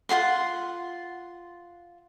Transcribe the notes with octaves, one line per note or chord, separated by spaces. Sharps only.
F4 G#4 F#5 C6